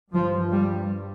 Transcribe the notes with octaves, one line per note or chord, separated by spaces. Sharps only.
G2 F3
G3